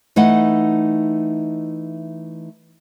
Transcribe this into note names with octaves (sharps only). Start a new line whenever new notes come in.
E3 A3 D#4 D#5 F#5